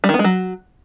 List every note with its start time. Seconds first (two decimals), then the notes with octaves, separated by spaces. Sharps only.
0.04 G3
0.09 D#3
0.14 B3
0.19 G#3
0.24 F#3